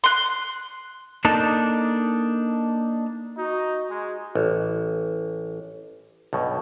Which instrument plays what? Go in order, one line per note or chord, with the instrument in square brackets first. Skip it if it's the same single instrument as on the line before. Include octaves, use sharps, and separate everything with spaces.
[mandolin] C6 F#6
[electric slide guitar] A#3 D4 D#4 A4
[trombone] D#4 [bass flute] F#4
[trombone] G#3
[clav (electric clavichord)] A1
B1 G2 B2